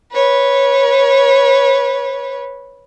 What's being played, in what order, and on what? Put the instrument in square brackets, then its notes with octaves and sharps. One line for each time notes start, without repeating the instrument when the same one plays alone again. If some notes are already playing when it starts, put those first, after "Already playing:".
[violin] B4 C#5